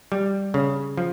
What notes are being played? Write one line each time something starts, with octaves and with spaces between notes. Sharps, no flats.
G3
C#3
F3